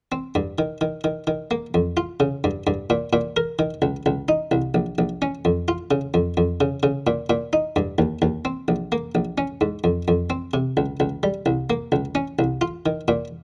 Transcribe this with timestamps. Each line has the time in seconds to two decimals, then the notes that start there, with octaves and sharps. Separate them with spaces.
0.12 C4
0.35 G2
0.58 D#3
0.81 D#3
1.04 D#3
1.27 D#3
1.51 A#3
1.74 F2
1.97 F4
2.20 C#3
2.44 G2
2.67 G2
2.90 A#2
3.13 A#2
3.37 A#4
3.59 D#3
3.82 C#2
4.06 C#2
4.29 D#4
4.51 C2
4.74 A#1
4.98 A#1
5.22 C#4
5.45 F2
5.68 F4
5.91 C#3
6.14 F2
6.37 F2
6.61 C#3
6.83 C#3
7.07 A#2
7.30 A#2
7.53 D#4
7.76 G2
7.98 D#2
8.22 D#2
8.45 C4
8.68 A#1
8.92 A#3
9.15 A#1
9.38 C#4
9.61 G#2
9.84 F2
10.08 F2
10.30 C4
10.54 C3
10.77 C#2
11.00 C#2
11.23 G3
11.46 C2
11.70 A#3
11.92 C#2
12.15 C#4
12.39 C2
12.61 F4
12.86 D#3
13.08 A#2